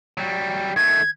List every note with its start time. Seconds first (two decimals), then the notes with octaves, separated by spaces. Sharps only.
0.17 F#3 G3
0.76 D#3 A3 G#6